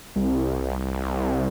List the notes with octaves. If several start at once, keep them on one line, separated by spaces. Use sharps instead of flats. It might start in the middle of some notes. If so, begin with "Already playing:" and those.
C2